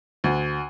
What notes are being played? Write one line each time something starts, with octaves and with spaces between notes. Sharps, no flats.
D2